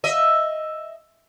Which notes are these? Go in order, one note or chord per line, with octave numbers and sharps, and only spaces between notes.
D#5 E5